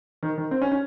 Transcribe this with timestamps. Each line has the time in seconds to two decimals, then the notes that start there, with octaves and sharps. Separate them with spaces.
0.23 D#3
0.38 D#3
0.51 C4
0.62 C#4
0.72 C#4